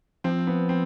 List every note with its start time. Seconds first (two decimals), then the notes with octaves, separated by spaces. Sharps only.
0.24 F3 C4
0.47 B3
0.69 C4